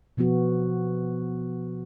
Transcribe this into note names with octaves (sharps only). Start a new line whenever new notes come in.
B2 F3 B3 F#4